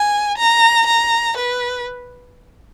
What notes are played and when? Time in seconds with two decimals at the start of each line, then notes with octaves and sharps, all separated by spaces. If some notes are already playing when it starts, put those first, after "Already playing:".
Already playing: G#5
0.37 A#5
0.86 A#5
1.37 B4